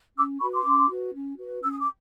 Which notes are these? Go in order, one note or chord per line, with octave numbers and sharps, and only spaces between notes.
C#4 D6 E6
F#4 B4 B5 C#6
C6 D6
C#4
F#4 B4
C#4
F#4 B4
C#4 E6
D#6
D6